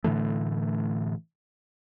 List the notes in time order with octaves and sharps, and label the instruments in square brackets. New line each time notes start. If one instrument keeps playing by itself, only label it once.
[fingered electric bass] A2 D3 E3 A3